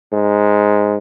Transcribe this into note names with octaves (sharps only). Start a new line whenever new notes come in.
G#2